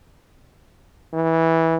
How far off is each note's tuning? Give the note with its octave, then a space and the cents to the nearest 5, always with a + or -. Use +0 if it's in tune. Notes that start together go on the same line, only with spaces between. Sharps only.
E3 -15